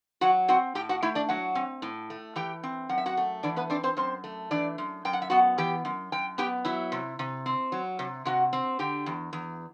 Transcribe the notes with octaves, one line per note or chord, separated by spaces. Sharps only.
F#3 F#4 F#5
C4 F#4 F#5
A2 G4 G5
F#4 F#5
A3 E4 E5
D4 D5
F#3 F#4 F#5
C4
A2
A3
E3 G4 G5
C4
F#2 F#5
E5
F#4 F#5
A3
E3 D4 D5
B3 B4
C4 D4 D5
C4 C5
F#2 C4 C5
A3
E3 D4 D5
F#2
F#2 G5
F#5
E5
B3 F#4 F#5
E3 G4 G5
F#2
F#2 G5
B3 G4 G5
F#3 E4 E5
C3
C3
C4
F#3
C3
C3 F#4 F#5
C4
D3 G4 G5
E2
E2